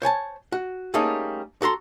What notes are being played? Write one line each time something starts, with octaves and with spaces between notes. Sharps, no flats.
C5 C#5 G#5 A5
F#4
G3 A3 A#3 C#4 D#4 G#4
F#4 A4 A#5 C6